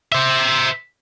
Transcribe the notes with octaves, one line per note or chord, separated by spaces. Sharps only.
C5 E5